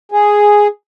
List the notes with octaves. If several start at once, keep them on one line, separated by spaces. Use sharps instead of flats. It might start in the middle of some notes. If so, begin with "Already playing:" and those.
G#4